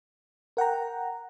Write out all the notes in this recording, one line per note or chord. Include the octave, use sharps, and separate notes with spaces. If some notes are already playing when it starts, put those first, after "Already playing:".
A#4 F#5 G5 A#5